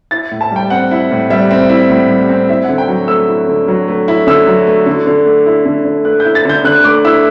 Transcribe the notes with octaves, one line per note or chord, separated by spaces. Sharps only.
E4 A6
A2
A5
G3 G5
C4 F#5
E4
A2
G3 E5
C4
E4
A2
G3
C4
E4 E5
F#5
D3
G5
F#3
A3 E6
E4
D3
F#3
A3
E4
D3 E6
F#3
A3
D3
D3
A3
E4
D3
D3
A3 F#6
G6
E4
A6
D3 G6
D3 F#6
A3 D6
E4 E6